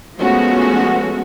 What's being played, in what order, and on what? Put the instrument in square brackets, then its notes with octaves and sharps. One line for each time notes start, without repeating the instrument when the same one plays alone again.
[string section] F3 G#3 A3 B3 C#4 F#4